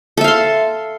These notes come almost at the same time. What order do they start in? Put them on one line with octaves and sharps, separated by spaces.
A4 E5 F5 C6